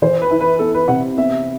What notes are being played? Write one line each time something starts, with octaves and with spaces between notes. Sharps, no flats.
E3 C5
B4
E4
B4
B3 A4
B4
C3 F#5
B3 E5